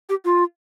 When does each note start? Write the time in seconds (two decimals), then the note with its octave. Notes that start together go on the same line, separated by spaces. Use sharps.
0.09 G4
0.25 F4